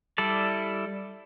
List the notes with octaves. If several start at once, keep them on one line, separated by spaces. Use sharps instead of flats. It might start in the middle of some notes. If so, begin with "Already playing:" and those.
G3 E4 A4 D5